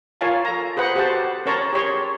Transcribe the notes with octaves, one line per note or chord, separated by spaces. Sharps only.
F4 A#4 C#5 F5 G#5 A5
A4 A#5
G#4 B4 C5 F#5
F#4 G4 A4 C5 F#5 A5
C#4 A#4 C#5 A5 A#5 C6
G4 G#4 C#5 C6